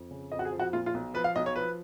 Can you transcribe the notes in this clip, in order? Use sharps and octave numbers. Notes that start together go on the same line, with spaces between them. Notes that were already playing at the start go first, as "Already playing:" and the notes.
Already playing: F2
C#3
F2 D#5
F#4
G#4
F3
F#4
A#2 F4
F4
B1
F3 B4
F5
B1 D#5
C#5
F3 B4